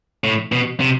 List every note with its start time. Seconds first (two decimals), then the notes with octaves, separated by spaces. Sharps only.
0.24 A2
0.52 B2
0.80 C3